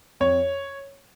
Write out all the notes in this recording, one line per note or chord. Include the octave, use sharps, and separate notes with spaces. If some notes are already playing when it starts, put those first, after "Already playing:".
F2 C#5